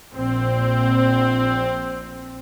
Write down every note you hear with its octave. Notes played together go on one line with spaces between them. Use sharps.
A#1 C4